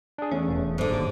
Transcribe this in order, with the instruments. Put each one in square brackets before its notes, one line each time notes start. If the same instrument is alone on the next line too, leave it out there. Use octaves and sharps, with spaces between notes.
[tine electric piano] D4 G#4
[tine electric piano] E2 A3 [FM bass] C#4
[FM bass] E1
E1
[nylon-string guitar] G#2 D3
[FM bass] G#1 [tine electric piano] D#2 D6